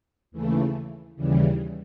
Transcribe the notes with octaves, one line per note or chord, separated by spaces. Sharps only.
D#2 C#3 E3 A3
D#2 C#3 E3 G3